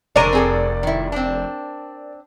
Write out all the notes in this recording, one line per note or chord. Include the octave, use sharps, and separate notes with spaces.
F1 D3 G#3 A#4 C#5 D5 D#7
C4 G#4 A4
D#3 E4
C4 D4